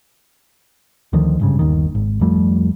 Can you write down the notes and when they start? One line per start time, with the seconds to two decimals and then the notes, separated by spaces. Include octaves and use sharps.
1.13 D2 D3 D#3 F3
1.39 G#1 G2 C#3
1.59 G1 D#2 D#3
1.95 G#1
2.21 F2 F3 G3 A3